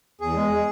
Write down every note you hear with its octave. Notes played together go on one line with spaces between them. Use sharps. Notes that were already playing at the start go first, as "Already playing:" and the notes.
E2 G#4
G#3